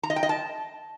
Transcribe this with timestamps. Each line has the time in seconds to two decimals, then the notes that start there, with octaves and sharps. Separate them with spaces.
0.03 A#5
0.10 D#5
0.16 G5
0.23 D#5
0.29 A5